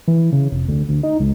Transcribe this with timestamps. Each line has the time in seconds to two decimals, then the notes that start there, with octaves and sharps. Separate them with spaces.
0.08 E3
0.32 C#3
0.52 F1
0.68 D2
0.89 D2
1.03 D#4
1.20 C#2